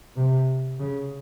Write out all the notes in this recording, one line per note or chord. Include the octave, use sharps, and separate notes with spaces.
C3
C#3